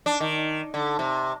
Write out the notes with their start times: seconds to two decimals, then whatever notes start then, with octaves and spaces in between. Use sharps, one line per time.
0.06 D4
0.20 D#3
0.74 D3
0.99 C3